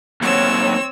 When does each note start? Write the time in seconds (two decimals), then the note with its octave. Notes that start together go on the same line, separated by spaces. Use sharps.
0.22 D#2 F#3 C4 C#5 E6